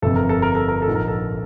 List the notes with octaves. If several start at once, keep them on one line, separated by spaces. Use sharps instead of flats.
G1 F2 C3 A4
A#4
A4
A#4
A4
A#4
A4
A#1 G#2 F3
A#4
A4